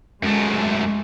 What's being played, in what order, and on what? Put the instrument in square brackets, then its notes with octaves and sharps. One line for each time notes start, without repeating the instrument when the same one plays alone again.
[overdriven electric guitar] F#2 A3 [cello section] G#3